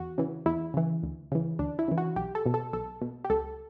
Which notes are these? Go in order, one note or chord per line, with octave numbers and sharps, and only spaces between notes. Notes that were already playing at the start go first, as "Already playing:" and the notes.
Already playing: E2 F#4
C#3 E3
E2 E4
C#3 E3
D2
C#3 E3
D2 D4
E4
C#3 E3
F#4
B1 G4
A4
B2
A4
B1 A4
B2
G4
C#2 A4